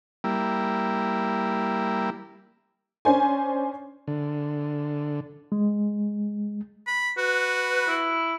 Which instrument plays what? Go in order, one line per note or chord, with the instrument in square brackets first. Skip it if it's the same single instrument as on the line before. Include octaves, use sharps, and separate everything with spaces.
[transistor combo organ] G3 A#3 E4
[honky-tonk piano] C#4 D4 C5 G#5
[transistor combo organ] D3
[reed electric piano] G#3
[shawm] B5
[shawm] F#4 [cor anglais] B4
[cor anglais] E4